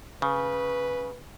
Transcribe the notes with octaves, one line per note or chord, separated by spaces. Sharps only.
C#3 B4